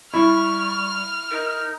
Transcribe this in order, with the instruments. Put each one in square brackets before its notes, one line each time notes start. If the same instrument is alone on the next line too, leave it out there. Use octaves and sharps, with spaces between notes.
[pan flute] G3 [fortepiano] E4 [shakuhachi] C#6 [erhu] F6
[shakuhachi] D#4 [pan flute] A#4